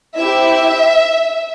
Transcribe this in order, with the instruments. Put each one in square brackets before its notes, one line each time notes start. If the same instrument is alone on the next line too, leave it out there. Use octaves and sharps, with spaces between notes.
[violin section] C4 E4 G4 E5